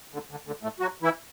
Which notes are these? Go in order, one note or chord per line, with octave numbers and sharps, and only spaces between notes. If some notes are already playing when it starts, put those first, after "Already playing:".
D2 D3
D2 D3
D2 D3
A2 A3
F#3 F#4
E3 E4